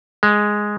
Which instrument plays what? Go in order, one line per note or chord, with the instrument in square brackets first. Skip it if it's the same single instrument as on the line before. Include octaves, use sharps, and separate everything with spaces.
[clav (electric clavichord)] G#3